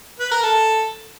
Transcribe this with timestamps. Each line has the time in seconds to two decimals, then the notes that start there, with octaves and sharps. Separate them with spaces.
0.20 B4
0.31 A#4
0.43 A4